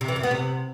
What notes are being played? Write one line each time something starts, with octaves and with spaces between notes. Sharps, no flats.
C3
E3
F#2
B3
C3